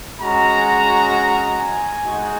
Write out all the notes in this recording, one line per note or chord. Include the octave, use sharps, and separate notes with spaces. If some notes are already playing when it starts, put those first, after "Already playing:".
G#3 C#4 F#4 A#5
G#5
G#3 D#4 F#4